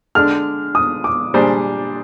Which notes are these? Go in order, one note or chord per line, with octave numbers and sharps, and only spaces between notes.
D3 G#3 D4 F6
D#6
D6
A#2 G3 D4 G#4 C5